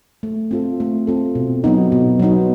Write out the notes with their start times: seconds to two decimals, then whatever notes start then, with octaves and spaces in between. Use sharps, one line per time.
0.23 A3
0.51 C4 F4 A4
0.80 A3
1.07 C4 F4 A4
1.35 B2
1.64 F#3 B3 D#4
1.92 B2
2.20 F#3 B3 D#4